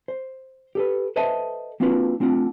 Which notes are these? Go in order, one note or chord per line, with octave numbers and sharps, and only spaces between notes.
C5
G4 A4 B4
A4 B4 C5 D#5 E5 A5
A#3 C4 D4 F4 F#4 B4
A3 C4 D4 F4 F#5